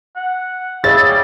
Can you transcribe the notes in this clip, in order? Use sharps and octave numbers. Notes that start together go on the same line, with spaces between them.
F#5
E4 G#4 C#5 F5 A6
G3